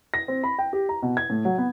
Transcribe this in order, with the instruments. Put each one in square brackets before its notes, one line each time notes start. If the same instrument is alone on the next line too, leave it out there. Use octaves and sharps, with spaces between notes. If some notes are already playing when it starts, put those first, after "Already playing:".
[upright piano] A#6
C4
B5
G5
G4
A#5
B2
G#6
A2
F#3
B3